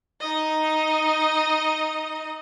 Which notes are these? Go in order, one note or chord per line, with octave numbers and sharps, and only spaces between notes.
D#4 D#5